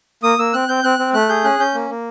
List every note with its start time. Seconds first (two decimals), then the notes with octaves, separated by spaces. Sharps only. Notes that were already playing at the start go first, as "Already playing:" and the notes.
0.23 A#3 D#6
0.39 A#3 E6
0.53 C4 F#6
0.69 C4 G6
0.84 C4 F#6
0.99 C4
1.14 A3 F#6
1.29 G#4 G6
1.44 C#4 F#6
1.59 C#4 G6
1.75 A#3
1.90 A#3